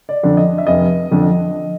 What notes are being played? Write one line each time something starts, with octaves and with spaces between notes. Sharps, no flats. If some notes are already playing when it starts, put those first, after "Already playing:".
D5
F2 D3
D#5
E5
F1 D#5
F2 D3